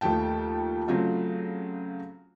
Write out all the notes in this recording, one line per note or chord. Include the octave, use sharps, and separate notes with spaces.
D#2 F3 A3 G5 A5
C#3 F#3 A3 C4 F4 F#4